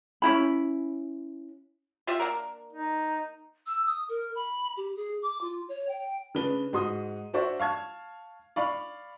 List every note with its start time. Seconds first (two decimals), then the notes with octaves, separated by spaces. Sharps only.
0.22 C#4 D#4 E4 B5
2.07 F4 G4 E5
2.20 A#3 D4 A#4
2.73 D#4
3.66 E6
3.86 D#6
4.09 A#4
4.35 B5
4.77 G4
4.96 G#4
5.22 D6
5.41 F4
5.69 C#5
5.88 G5
6.35 C#3 D4 B4 G7
6.73 G#2 F#4 C6 D#6
7.33 D4 F#4 C5 D5 E5 C#6
7.60 F5 A5 C#6 F6 G#6
8.56 D5 F5 B5 C#6